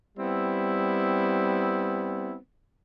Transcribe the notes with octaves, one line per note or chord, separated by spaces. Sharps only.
G3 B3 C4 E4